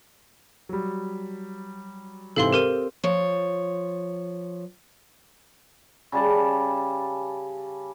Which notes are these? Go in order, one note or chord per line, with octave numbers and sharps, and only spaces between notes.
F#3 G3
G#2 C3 E3 A4 F5 C6
C4 G4 A#4 D#7
F3 C#5
C#3 G3 A5 C#6